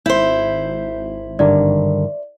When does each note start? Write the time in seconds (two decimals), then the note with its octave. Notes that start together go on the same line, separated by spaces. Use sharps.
0.06 G#1 E4 C5 G6
1.39 G2 D3 D#3 D5